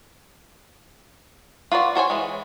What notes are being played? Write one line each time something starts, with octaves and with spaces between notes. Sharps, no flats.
F4 F#4 B4 D5
F#4 C5 C#5 G#5
E3 G#3